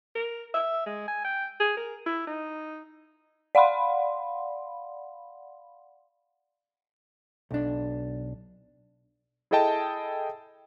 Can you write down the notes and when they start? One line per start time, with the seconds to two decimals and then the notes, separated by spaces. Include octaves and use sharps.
0.15 A#4
0.54 E5
0.86 G#3
1.08 G#5
1.25 G5
1.60 G#4
1.77 A#4
2.06 E4
2.27 D#4
3.55 D5 F5 F#5 B5 C6
7.51 B1 D4
9.51 E4 G#4 A4 D#5 G5 A5